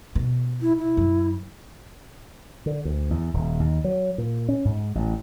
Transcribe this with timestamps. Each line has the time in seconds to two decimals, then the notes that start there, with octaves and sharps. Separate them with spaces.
0.15 B2
0.62 E4
0.78 E4
0.97 F#2
2.66 D3
2.85 D2
3.10 E2
3.34 D#1
3.60 D#2
3.84 F#3
4.18 A#2
4.49 C#4
4.65 G#2
4.95 A1